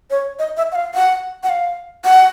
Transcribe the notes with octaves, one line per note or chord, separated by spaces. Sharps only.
C#5
D#5
E5
F#5
F5
F#5
F#5
F5
F#5